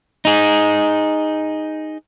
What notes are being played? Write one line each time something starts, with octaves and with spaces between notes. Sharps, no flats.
D#4 G#4